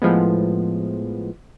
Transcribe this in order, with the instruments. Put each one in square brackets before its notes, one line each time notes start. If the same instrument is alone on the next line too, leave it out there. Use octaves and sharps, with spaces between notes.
[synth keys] A2 F3 G#3 B3